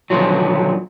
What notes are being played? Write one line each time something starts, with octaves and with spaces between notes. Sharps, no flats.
B2 D3 D#3 F3 F#3